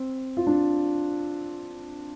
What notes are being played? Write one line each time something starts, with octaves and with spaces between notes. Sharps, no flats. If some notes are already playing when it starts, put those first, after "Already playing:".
Already playing: C4
F4
D4